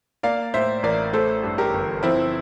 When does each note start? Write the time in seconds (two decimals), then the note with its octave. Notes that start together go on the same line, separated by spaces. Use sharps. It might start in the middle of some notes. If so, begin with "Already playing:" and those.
0.23 A#3 D5 F5
0.54 A2 C5 E5
0.83 A1 A#4 D5
1.13 A3 A4 C5
1.43 G2
1.58 G4 A#4
1.74 G1
2.03 F3 C4 E4